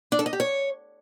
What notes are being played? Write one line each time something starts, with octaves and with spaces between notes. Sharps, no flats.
D4
A4
D#5
G4
C#5